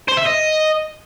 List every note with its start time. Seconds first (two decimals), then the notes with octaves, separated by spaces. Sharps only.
0.08 C5
0.17 E5
0.26 D#5